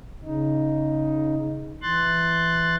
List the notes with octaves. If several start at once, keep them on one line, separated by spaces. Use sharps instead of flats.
C#3 D#4
E3 C6 F#6 A6